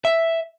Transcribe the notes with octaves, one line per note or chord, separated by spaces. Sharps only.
E5